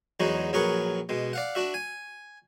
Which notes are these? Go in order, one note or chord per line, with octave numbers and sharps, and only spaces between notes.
E2 F#3 G#3 D#4 F#4
A#1 F#3 G#4 A#4 B4 C#6
B2 G#3
D5 F5 F#5
D4 F#4 E5
G#5